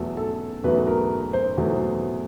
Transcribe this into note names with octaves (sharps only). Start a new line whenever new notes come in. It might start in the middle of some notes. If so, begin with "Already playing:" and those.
Already playing: E2 B2 F#3 A3 A4
A4
E2 B2 F#3 A3 B4
A#4
C5
E2 B2 F#3 A3